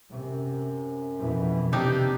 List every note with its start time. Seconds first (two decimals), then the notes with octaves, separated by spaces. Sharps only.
0.11 F#2 C3
1.19 F2 B2 E3
1.72 C3 D4 D#4 G4